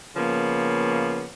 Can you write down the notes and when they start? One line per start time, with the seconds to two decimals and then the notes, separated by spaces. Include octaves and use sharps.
0.16 C#3 F3 A#3 B3